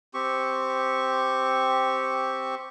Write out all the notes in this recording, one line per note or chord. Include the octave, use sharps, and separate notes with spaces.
C4 G4 C#6